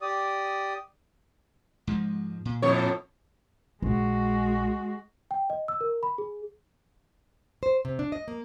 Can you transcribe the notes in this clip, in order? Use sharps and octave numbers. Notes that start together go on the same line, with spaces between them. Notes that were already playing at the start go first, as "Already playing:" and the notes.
G4 D5 D#6
G#2 F3 G#3
A#2
F2 A2 C#5
A#1 G#3 F#4
G5
D#5
E6
A#4
B5
G#4
C5
C3
D4
D#5
A#3